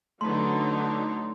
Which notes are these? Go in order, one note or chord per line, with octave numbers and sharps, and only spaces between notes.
D3 F#3 A3 C#4 D#4 B4 C6